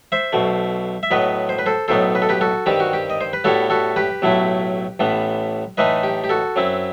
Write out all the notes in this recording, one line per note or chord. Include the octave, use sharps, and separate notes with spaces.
C5 E5
B1 B2 A3
E5
A2 F#3 B3 B4 D#5
C5
B4
A4 C5
B1 A2 F#3 B3 D#4 A4 C5
B4
A4
G4 B4
F#4 A4
G2 D#3 G3 C4 G4
F#4
G4
D#5
C5
B4
A2 G3 B3 E4 F#4 A4
F#4 A4
G4 B4
B1 A2 F#3 A3 E4
A1 A2 E3 B3
A2 E3 A3 D#4 B4 D#5
G4
G4
F#4 A4
F#2 F#3 C4 E4